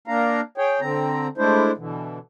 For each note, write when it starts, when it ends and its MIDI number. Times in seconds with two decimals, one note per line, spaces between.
0.08 0.41 58
0.08 0.41 62
0.08 0.41 77
0.08 0.41 82
0.58 0.80 68
0.58 0.80 73
0.58 0.80 79
0.81 1.28 50
0.81 1.28 60
0.81 1.28 82
1.38 1.72 56
1.38 1.72 57
1.38 1.72 62
1.38 1.72 64
1.38 1.72 72
1.77 2.19 47
1.77 2.19 50
1.77 2.19 52